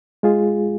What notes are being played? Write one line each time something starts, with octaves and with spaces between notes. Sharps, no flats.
G#3 F4 G#4